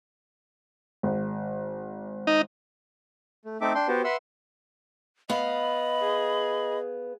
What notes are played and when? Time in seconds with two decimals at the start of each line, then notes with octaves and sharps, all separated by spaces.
1.03 G#1
2.27 D#4
3.45 A3
3.61 A3 C4 D#4 A4 E5 D6
3.75 D4 G5 C6
3.88 B3 F#4 G4 C5
4.04 B4 E5 F#5 C6 E6
5.30 B3 D#5 F5 B5
6.01 G#4